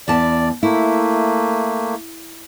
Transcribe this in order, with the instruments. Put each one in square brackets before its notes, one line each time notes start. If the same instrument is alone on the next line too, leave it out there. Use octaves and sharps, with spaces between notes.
[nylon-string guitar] E2 B3 A5 [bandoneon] D5
[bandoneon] A3 A#3 [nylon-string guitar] E4